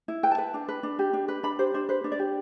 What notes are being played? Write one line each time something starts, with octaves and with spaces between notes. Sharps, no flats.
E4
B4 G5
A5
B4
D4
B4
D4
G4
D4
B4
D4 B5
G4 C5
D4 C5
B4 C5
D4
D5
G4